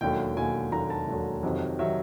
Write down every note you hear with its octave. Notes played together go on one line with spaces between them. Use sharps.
E1 D#2 D3 F#3 G5
E1 D#2 D3 F#3 G#5
E1 D#2 D3 F#3 A#5
A5
E1 D#2 D3 F#3
F2 C3 D#3 F#3
C3 D#3 F#3 E5